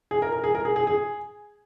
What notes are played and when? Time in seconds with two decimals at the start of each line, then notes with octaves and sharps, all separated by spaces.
0.11 G#4
0.22 A#4
0.32 A#4
0.44 G#4
0.55 A#4
0.65 G#4
0.76 G#4
0.87 G#4